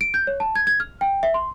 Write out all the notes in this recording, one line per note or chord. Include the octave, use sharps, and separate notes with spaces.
D7
G6
C#5
A5
G#6
G#6
F6
G5
E5
C6